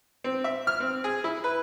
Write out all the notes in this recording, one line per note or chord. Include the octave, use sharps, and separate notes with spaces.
C4
E5
F6
C4
G#4
E4
B4